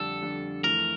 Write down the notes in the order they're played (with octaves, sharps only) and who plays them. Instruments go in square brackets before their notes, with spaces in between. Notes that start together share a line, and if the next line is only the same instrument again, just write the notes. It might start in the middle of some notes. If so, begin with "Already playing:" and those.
Already playing: [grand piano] F2 D3 G3 D4 [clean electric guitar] A4
[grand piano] F2 D3 G3 D4
[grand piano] F2 E3 A3 [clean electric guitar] A#4